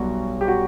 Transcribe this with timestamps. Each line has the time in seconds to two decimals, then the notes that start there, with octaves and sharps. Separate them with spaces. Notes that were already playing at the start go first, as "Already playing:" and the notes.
Already playing: B1 B2 G3 F#4
0.41 G4
0.48 F#4